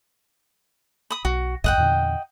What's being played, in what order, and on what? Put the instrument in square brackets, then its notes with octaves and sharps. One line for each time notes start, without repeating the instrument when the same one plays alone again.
[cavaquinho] B5 D#6
[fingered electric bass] B1 [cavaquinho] F#4
[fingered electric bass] G#1 C#2 F#2 [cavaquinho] D#5 F#5 G5
[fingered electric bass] E2 A#2 D3